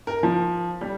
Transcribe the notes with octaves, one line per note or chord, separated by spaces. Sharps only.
A#4
F3
G3